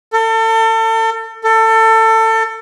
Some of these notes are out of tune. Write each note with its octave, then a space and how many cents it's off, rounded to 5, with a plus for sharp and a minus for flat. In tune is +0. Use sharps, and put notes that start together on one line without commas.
A4 +35
A4 +25